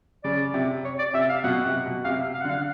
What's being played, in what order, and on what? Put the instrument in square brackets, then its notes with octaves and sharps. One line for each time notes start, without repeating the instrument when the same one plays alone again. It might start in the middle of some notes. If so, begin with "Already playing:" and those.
[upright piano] C#3 [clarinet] D5
[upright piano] C3
[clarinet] C#5
D5
[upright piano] C3 [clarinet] E5
[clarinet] F5
[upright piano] B2 [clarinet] F#5
[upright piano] C3
B2
[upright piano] C3 [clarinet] F5
[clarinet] E5
F5
F#5
[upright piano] D3
[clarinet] F5